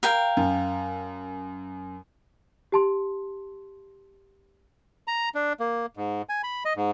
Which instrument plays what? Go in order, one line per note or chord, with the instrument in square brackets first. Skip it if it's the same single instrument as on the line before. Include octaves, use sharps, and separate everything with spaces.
[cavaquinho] A#4 F5 G5
[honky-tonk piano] F#2
[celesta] G4 A5 C6
[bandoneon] A#5
D4
A#3
G#2
G#5
B5
D#5
G#2